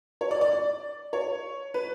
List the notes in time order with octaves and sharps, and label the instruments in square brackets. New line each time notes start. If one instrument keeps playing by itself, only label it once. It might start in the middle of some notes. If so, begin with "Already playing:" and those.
[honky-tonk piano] C#5
D5
D5
D5
C#5
B4